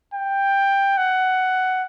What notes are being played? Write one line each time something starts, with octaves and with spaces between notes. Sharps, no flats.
G5
F#5